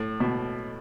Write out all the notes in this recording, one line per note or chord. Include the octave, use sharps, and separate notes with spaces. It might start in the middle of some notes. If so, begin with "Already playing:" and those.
Already playing: A2
B2